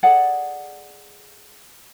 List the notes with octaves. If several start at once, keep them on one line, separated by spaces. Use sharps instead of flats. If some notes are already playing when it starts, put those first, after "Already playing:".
G#4 A4 D5 F#5